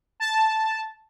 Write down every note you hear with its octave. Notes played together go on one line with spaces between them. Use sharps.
A5